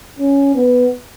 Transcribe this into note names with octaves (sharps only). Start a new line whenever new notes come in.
C#4
B3